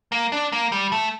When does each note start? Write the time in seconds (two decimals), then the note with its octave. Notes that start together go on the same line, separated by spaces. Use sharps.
0.12 A#3
0.32 D4
0.52 A#3
0.72 G3
0.92 A3